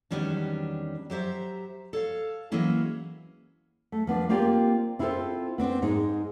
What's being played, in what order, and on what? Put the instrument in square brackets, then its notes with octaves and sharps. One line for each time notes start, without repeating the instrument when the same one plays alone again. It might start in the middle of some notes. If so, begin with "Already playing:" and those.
[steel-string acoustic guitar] E2 D#3 F#3 G3 C#4 D4
F#3 G4 C5 E5 A#5
A4 C#5 F5
E3 F#3 G#3 A#3 C#4 E4
[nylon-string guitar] A3
F3 B3 D4
A#3 C4 F4 G4 D5 G5
C4 E4 F4 G4 A4 C5
B3 C4 D4
G#2 G#3 D#4